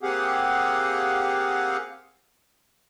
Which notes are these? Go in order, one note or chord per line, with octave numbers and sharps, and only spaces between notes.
A#3 C4 G4 G#4 F5 F#5